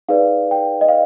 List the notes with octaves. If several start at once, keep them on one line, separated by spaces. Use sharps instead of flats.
D#4 G#4 B4 D5 F5
G5
D#5
F5